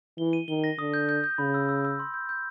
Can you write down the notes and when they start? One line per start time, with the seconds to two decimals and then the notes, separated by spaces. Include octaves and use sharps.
0.18 E3 G7
0.33 D#7
0.48 D#3 G7
0.64 A#6
0.79 D3 D#6
0.94 G6
1.09 G6
1.24 G6
1.38 C#3 B5
1.54 E6
1.69 E6
1.85 E6
1.99 C6
2.14 G6
2.29 G6